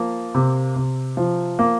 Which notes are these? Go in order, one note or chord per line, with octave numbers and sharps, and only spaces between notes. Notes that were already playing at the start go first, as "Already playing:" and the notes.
Already playing: F3 A#3
C3
C3
F3
A#3